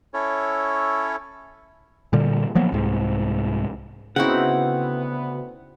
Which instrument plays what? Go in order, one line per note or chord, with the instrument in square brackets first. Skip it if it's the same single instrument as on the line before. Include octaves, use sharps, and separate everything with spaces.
[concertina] C#4 E4 A4 C#5
[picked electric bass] A#2 D3 G3
F3 F#3 A#3 B3
C2 G#2
[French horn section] D2 B3 [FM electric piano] C#3 F#4 [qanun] C4 D#4 E4 [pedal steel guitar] F#5